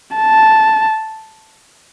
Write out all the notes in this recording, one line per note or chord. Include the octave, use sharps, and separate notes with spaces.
A5